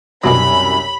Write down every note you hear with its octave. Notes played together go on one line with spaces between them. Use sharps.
C2 F#2 B2 D3 F#3 G#5 B5